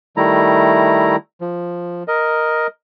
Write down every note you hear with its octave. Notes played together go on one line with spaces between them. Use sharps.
D#3 G3 A3 E4 A#5
F3
A#4 D#5